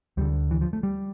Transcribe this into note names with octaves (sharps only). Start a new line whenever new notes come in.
D2 D3 G3
E3
F3
A3
G3